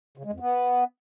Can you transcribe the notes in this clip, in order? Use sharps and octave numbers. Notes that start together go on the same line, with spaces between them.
C#3
G#3
F2
B3